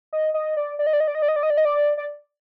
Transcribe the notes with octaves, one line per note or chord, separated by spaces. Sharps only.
D#5
D#5
D5
D5
D#5
D5
D#5
D5
D#5
D5
D#5
D5
D#5
D5
D#5
D5
D5